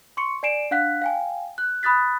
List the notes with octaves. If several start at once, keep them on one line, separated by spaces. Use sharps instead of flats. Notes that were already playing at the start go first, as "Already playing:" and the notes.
C6 C#6 C#7
D5 G#5 C7 D7 E7
D4 F5 F#5 F#6 B6
F5 G5 G#5
F#6
B5 D#6 F#6 A6 B6